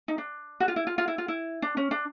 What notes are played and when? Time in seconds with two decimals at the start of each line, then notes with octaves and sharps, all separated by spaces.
0.08 D#4
0.18 D4
0.60 F#4
0.68 F4
0.76 E4
0.87 F4
0.98 F4
1.08 E4
1.18 F4
1.28 E4
1.62 D4
1.77 C#4
1.91 D4